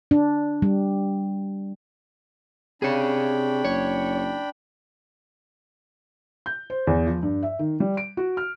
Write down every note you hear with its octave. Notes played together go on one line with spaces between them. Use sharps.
D4
G3
C3 D4 G#4 C#5 G5 B5
F#1 C#5
G6
C5
E2
F3
G2
E5
D#3
G3
D7
F#4
F6